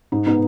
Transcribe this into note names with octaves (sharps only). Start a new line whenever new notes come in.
G#2 D#4
B3 D#4